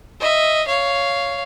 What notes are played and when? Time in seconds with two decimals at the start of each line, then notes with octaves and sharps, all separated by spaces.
0.21 D#5 E5
0.67 C#5 F5